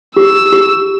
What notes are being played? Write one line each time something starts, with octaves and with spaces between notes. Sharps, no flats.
G4 E6
G4